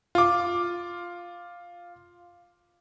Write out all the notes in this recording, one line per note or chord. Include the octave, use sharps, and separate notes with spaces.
F4 D6